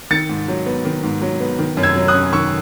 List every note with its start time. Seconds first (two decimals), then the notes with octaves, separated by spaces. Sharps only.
0.11 D#3 A6 C#7
0.29 G#2
0.48 F#3
0.66 B3
0.85 D#3
1.03 G#2
1.22 F#3
1.40 B3
1.59 D#3
1.77 F#2
1.83 E6 G#6
1.96 F#3
2.08 D#6 F#6
2.14 C#4
2.33 D#3 C#6 E6